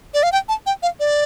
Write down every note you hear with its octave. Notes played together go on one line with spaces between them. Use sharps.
D5
F5
G5
A5
G5
F5
D5